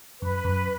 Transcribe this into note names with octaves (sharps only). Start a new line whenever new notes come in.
F#2 B4
F#2